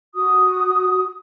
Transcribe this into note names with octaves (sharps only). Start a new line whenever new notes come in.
F#4 D#6